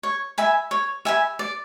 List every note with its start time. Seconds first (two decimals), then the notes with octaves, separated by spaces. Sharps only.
0.03 C#5
0.38 E5 G#5 B5
0.71 C#5
1.05 E5 G#5 B5
1.39 D5